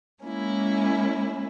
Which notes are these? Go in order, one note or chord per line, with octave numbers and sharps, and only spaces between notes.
G#3 A#3 C#4 E4